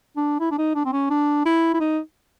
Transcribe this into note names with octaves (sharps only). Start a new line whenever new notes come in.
D4
E4
D4
D#4
D4
C4
C#4
D4
E4
E4
D#4